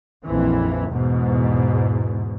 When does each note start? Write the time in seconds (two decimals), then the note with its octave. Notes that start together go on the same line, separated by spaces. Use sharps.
0.25 A#1 F2 E3
0.89 E2 G#2 B2